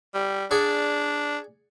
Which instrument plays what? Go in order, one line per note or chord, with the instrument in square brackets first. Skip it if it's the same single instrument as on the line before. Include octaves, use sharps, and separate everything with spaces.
[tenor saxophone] G3
[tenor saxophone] D4 [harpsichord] G#4 D5 F#5